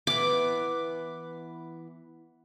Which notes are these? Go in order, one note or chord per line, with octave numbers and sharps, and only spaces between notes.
E3 B3 D6